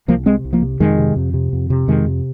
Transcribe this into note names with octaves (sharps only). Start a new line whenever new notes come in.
C2 F3 A#3
C3 G#3 C4
C2
F3 A#3
C3
F2 D#3 G#3
C3
F2
C3
F2
C3
F2 D#3 G#3
C3